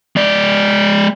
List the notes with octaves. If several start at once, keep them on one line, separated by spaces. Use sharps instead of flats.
G#3 D5